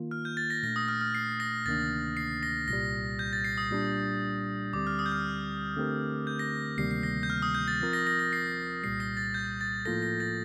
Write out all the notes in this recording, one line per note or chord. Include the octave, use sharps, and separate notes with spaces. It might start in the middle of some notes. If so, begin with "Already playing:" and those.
Already playing: D#3 A#3 F4
F6
G6
A6
A#6
A#2 A3 D4 A#6
D#6
F6
F6
C7
A#6
D2 C3 D#3 A#3 D4 A6
C7
A#6
C2 A#2 G3 A#6
G6
A6
C7
D#6
A#2 G3 D4
D2 D3 G3 C4 D6
F6
D#6
G6
F6
D3 A3 C4 G4 A#4
G6
A#6
D2 C3 D#3 G3 A#3 C7
C7
A#6
G6
F6
D#6
G6
A6
F3 C4 F4 A#4
A#6
A#6
A#6
C7
C2 A#2 G3 C7
A#6
A6
G6
A6
A2 F3 A#3 F4 A4 A#6
A#6
A6